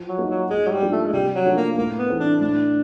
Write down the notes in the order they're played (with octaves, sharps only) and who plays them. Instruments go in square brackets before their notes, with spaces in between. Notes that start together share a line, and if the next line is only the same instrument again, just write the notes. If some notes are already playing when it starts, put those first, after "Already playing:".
Already playing: [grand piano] F3
[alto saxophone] F#3
[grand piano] A#3 D#4 F#4
[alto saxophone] F#3
[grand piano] G#2 [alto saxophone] G#3
[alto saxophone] F#3
G3
[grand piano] F3 A#3 D4 F4
[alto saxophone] A3
G#3
[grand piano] C3 [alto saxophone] G3
[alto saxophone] F#3
[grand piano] F3 A3 D4
[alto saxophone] A#3
[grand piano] A2 [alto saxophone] A#3
[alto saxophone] B3
[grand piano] E3 A3 C4
[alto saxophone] D4
[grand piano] A2 [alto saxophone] D4